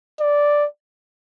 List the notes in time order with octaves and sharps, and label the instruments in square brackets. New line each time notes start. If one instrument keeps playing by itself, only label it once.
[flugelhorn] D5